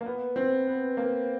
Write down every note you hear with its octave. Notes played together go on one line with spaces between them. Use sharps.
A#3
B3
C4
B3
A#3